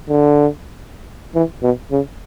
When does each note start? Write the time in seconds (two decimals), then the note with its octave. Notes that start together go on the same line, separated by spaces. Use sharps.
0.09 D3
1.35 E3
1.63 B2
1.91 C#3